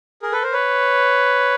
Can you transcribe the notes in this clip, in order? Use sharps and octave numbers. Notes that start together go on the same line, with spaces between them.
G#4 A#4
A4 B4
A#4 C5
B4 C#5